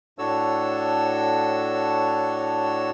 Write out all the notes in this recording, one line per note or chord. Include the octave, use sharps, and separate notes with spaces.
A2 D4 F#4 A4 C#5 E6